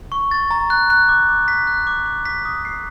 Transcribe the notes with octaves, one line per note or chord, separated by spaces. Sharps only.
C#6
A6
A#5
F#6
F#6
D6
D6
B6
F#6
D6
D6
B6
D#6
C7